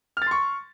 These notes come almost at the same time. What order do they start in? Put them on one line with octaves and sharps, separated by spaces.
F6 A6 C6 C#6